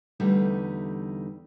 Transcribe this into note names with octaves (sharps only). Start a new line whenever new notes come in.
E2 D3 G3 A3 D#4